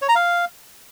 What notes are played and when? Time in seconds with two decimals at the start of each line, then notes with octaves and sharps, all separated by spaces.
0.02 C#5
0.08 A#5
0.15 F5